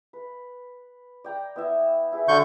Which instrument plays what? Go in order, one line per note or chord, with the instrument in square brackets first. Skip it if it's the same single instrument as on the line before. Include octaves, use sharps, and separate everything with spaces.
[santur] B4
D5 G5 A#5
B3 E4 E5
E4 G#4 B4
[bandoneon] D3 C#6 G6 [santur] F#3